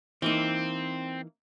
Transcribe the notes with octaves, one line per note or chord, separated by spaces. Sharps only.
E3 A#3 C4 D#4